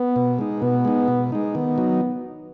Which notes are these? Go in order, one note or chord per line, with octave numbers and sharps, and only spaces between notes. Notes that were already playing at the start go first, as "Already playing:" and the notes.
Already playing: B3
B2
G#3 D#4
B2 B3
G#3 D#4
B2
G#3 D#4
D#3 B3
F#3 D#4